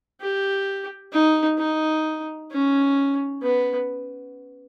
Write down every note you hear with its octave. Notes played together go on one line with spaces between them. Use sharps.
G4
D#4
D#4
C#4
B3